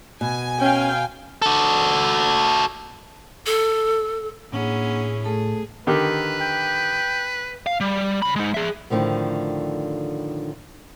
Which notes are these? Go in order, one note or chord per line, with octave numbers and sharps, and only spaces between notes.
B2 G#5
C#4 F5 G5
F#4 A4
A4
A2 A#3 C#4 D4 E4 G#4 F#5
A3 G#4 A4 A5
D3 D#3 G4 B4
G5
F5
G3
C#3 B5
G#3 D#4
G#4 E5
A2 D3 D#3 F3 A3